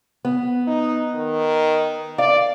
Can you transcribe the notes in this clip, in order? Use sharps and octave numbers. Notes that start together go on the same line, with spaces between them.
B3
D#4
D#3
D5 F5